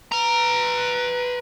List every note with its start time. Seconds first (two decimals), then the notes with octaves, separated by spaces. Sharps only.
0.12 B4 A#5